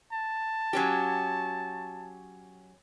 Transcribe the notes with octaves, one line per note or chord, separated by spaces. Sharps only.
A5
F#3 C#4 G4